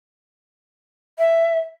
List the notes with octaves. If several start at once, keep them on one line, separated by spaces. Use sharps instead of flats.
E5